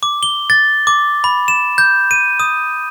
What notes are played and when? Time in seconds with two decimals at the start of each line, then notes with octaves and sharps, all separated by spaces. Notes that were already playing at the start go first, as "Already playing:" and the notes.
0.03 D6
0.23 G7
0.50 A6
0.87 D6
1.24 B5
1.48 E7
1.78 G6
2.11 D#7
2.40 D#6